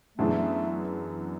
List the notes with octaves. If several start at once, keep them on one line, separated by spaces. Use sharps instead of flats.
F#2 E3 A3 B3 D4 G#4